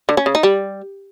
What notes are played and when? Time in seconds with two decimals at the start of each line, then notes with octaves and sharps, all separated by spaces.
0.09 D3
0.17 C#4
0.26 C#3
0.35 D#4
0.43 G3